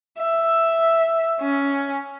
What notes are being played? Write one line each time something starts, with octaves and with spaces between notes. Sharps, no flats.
E5
C#4